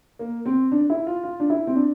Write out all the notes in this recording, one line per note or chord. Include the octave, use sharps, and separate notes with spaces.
A#3
C4
D4
E4
F4
F4
D4
E4
C4
D4